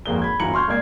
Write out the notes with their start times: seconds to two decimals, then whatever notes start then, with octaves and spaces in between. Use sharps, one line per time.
0.06 G#1 F2 A#3 G#4 G7
0.22 B5 G#6
0.40 D1 G1 E3 A#5 C#7 F#7
0.54 C6 C#6 F6 G6 G#6
0.68 C#2 A#3 D5 G#6 C7